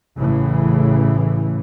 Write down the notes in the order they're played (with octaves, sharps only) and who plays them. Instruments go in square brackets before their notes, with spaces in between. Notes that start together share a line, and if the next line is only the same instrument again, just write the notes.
[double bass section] A1 A2 C#3 E3